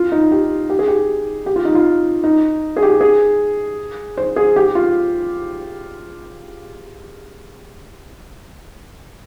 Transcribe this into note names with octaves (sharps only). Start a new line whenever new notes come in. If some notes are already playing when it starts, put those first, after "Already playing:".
Already playing: F4
D#4
G4
G4
G#4
G4
G4
F4
D#4
F4
D#4
G#4
G4
G#4
C5
G#4
G4
F4